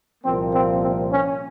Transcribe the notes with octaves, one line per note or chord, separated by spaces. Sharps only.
C2 A#2 F3 A#3 C4
C4
C4
C#4